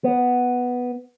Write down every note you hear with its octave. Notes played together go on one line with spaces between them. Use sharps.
B3